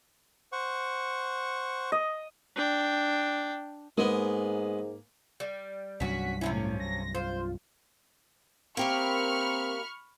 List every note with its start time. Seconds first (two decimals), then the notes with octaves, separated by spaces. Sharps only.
0.52 C5 F#5 C#6
1.92 D#5
2.56 D4 G5
3.98 G#2 G#3 A#3 B3
5.40 G3
6.00 C2 G2 F#3 C#4 F#4 B6
6.41 C3 F3 C#4 E4
6.53 A2
6.80 A#6
7.15 F4 C5
8.77 A#3 C4 G4 A#4 E5 B5 C#6 F6